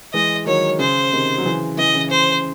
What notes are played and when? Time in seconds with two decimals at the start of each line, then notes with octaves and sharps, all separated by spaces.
0.13 E3 G#3 D#5
0.46 D#3 F#3 C#5
0.79 C#3 C5
1.12 C3 D#3
1.38 F#3
1.45 C#3 E3
1.78 C#3 E3 D#5
1.95 C#3 E3
2.11 C5